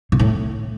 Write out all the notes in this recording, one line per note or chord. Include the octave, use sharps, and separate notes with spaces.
A#2
A2